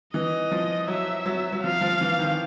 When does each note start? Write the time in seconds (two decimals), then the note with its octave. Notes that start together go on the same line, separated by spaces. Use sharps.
0.13 E3 D#5
0.51 F3
0.88 F#3 E5
1.26 F#3
1.53 F#3
1.63 F3 F5
1.81 F3
2.01 E3
2.19 D#3